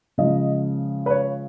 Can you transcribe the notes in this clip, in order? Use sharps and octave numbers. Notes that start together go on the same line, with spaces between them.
C#3 F3 G#3 D#5
B4
C#5